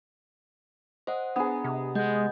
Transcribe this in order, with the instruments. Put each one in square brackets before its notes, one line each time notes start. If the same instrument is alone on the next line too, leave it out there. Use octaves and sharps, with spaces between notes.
[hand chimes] C5 F#5 [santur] D#5
[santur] B3 G#4 [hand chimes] D4 A#5
[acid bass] C3
[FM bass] G#3 [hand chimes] D#5 F#5 G6